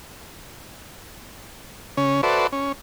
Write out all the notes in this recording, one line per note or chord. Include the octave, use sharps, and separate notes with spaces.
C#3 C#4
F#4 A4 B4 C5 D5 E5
C#4